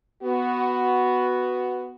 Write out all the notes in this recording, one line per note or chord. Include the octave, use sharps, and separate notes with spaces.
B3 F#4